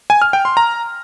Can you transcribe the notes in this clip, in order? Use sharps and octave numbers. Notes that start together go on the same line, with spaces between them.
G#5
F6
G5
C6
A#5